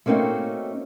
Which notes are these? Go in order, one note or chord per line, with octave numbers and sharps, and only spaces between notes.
A3 A#3 C4 C#4 D#4 F#4